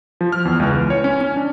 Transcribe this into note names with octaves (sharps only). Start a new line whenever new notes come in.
F3
F6
E2
C#2
E3
C#5
C#4
C#4
D4